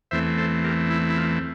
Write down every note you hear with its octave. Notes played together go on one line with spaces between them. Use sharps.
E2 E3 A3 C4 C5 E5
A4 C5
G4 A#4
E4
E4
F4